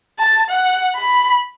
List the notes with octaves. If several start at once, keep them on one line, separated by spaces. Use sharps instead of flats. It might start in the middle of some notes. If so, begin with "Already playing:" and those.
A5
F#5
B5